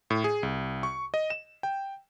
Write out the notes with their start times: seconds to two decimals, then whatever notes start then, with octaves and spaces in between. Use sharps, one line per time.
0.10 A2
0.24 G#4
0.43 C2
0.83 C#6
1.14 D#5
1.30 E7
1.63 G5